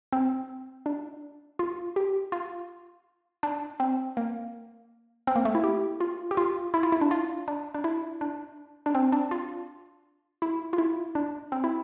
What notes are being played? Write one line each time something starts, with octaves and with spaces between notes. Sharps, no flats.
C4
D4
F4
G4
F4
D4
C4
A#3
C4
A#3
A3
E4
G4
F4
G4
F4
E4
F4
E4
D4
F4
D4
D4
E4
D4
D4
C4
D4
F4
E4
F4
E4
D4
C4
E4